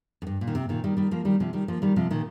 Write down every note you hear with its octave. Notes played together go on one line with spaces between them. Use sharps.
F2
G2
A#2
D#3
C3
A#2 D#3
D#3 G3
D#3 G3
F3 A#3
D#3 G3
C3 F3
D#3 G3
F3 A#3
D#3 G3
C3 F3
A#2 D#3